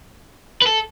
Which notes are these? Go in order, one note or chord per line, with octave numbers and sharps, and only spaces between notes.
B4
A4